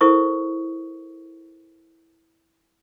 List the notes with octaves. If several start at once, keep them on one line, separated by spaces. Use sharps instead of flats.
E4 A4 A#4 C5 C#6 D#6